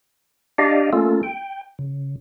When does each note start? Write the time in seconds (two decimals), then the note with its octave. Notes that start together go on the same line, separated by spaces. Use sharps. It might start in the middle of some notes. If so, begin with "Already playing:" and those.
0.58 D4 G4 D5 D#5 F5
0.93 A3 A#3 C#4 F4 A4
1.23 G5
1.79 C#3